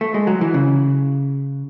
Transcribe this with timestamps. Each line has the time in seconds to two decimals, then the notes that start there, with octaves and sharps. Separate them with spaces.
0.01 A3
0.14 G#3
0.27 F#3
0.41 E3
0.54 C#3